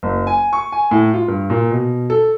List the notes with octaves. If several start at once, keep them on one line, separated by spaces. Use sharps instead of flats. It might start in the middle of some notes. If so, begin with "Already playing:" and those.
F#1
G#5
C#6
G#5
A2
F4
G2
A#2
B2
A4